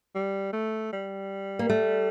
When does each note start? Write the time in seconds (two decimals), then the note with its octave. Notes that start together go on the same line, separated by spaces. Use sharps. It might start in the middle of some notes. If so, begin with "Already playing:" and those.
0.15 G3
0.53 A3
0.93 G3
1.59 A#3
1.69 A3